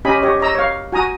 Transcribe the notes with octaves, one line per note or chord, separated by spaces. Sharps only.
C#4 G4 D#5 G#5 B5
G4 C#5 D#5
C#5 D#5 A#5 E6
C#5 F5
F#4 G#5 A#5 D#6